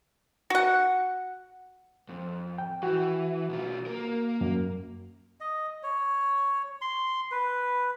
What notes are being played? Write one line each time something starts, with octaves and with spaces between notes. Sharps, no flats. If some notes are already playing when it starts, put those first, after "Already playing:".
F#4 F#5
F2
G5
E3 F#4
B1 F4
A#3 A#4
F#2
D#5
C#5
C6
B4